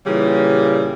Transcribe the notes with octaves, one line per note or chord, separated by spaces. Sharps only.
A#2 C#3 E3 G3